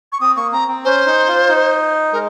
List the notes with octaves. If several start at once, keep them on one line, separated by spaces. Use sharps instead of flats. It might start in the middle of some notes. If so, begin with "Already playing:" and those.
C#6
C4 D#6
A#3 C#6
C4 A#5
C4
C#4 C5
D#4
F4
D#4
G#3 A#4